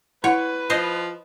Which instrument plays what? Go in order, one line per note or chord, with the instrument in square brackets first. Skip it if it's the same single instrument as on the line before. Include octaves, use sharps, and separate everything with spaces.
[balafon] E4 F#5 [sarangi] B4 [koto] C#5
[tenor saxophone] F3 [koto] C5 D#5